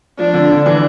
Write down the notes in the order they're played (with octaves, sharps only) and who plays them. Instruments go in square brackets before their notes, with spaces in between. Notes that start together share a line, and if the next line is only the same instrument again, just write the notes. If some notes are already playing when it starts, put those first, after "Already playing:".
[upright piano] F3 [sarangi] D4
[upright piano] D3
D3
E3